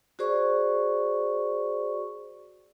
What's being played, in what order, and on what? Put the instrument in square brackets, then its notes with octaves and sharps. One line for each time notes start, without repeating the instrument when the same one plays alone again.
[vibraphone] F#4 G#4 C5 D5 C#6